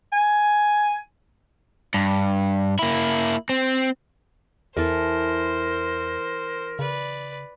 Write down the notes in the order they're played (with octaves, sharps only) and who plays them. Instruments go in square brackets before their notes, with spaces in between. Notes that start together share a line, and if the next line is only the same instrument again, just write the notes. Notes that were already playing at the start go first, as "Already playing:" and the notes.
[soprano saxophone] G#5
[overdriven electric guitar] G2
A#3 E4
C4
[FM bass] E2 [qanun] E3 A4 [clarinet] A#4 [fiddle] C5
[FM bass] C#3 [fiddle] B4 D5